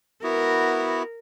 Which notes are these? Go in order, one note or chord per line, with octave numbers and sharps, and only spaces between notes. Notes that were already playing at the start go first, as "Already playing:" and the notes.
B3 E4 F#4 A#4